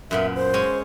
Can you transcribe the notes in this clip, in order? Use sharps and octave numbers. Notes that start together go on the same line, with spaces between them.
F#2 A#2 B3 E5
C5
G#3 C#4